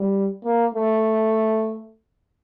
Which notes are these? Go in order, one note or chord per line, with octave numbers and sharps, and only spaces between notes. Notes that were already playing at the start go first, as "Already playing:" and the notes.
Already playing: G3
A#3
A3